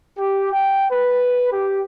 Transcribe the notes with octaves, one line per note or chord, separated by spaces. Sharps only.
G4
G5
B4
G4